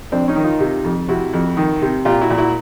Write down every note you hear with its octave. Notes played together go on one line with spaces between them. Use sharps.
F2 C4 D4
C#4 D#4
D#3
D#4 F4
C3
F2
C3 E4 F#4
F2
D#3
C3
A#2 F4 G4
E4 F#4
A#2
E4 F#4